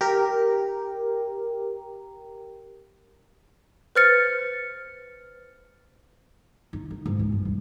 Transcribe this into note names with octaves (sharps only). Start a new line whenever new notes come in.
G4 A#4
B4 C5 F6 A6 C#7
D#4
D#4
G#2
C#2
G2
D#1